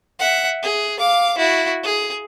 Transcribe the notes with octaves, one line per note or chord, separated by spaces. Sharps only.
E5 F#5
G#4
F5 D6
E4 F#4
G#4